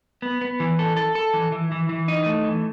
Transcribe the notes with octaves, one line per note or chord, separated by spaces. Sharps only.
B3
B3
E3
A4
A4
A4
E3
E3
E3
E3
D#4
A3
E3